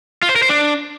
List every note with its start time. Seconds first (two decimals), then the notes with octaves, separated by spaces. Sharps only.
0.22 F4
0.29 C5
0.36 A#4
0.43 C5
0.49 D4